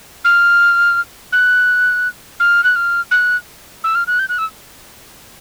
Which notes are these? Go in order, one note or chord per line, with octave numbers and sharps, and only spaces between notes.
F6
F#6
F6
F#6
F6
F#6
E6
F6
F#6
G6
F#6
E6